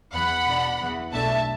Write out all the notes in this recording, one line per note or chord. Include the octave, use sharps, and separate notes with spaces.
E2 E3 B3 F#5 B5
B2 B3 D4
E2 E3 B3
B1 B2 A3 D4 E5 A5